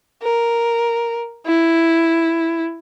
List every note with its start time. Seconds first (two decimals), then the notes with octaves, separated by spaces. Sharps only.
0.22 A#4
1.46 E4